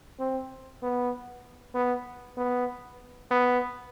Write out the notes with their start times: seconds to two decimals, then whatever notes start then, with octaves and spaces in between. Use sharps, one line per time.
0.19 C4
0.82 B3
1.75 B3
2.37 B3
3.31 B3